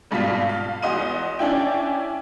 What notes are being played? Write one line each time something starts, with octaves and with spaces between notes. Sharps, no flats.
G#1 G2 B2 F4 B6
F5
E2 F#4 D#5 C6 D#7
C#4 D4 E4 G5